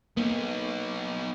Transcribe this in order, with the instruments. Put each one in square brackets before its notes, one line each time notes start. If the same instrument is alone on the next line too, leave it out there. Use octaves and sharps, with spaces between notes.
[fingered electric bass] A#3 [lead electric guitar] B3 D#4